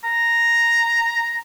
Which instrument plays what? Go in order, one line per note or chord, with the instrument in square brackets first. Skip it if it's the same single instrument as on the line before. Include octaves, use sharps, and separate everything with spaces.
[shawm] A#5